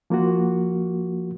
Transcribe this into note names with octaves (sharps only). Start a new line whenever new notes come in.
F3 A#3 F4 F#4